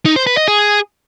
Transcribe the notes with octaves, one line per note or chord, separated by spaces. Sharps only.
D#4
C5
B4
D#5
G#4